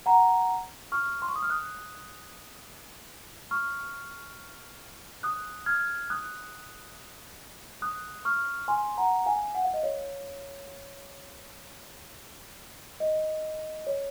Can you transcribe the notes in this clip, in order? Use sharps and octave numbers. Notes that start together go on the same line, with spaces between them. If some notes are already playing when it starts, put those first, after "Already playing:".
F#5 A#5
C#6 F6
C6
C#6
D#6
F6
D#6 F#6
C#6 F6
D#6 F#6
F6 G#6
D#6 F#6
D#6 F#6
C#6 F6
G#5 C6
F#5 A#5
F5 G#5
F#5
F5
D#5
C#5 F5
D#5
C#5